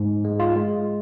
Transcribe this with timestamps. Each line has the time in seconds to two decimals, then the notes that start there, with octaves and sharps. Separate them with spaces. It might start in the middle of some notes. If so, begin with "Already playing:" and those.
Already playing: G#2
0.25 G#3
0.40 F4
0.56 G#3